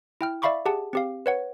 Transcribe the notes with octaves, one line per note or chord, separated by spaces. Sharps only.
E4 G5 F6
D5 E5 F5 B5 C#6 D6
G4 G#4 F#5 A5
C4 G4 F5
B4 C#5 F#5